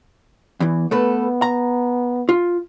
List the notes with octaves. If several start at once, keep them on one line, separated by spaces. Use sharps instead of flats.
E2 E3
A3 B3 A4 B4
A#5
F4